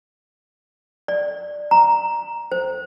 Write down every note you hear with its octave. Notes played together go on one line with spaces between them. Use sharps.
D5
A#5
C5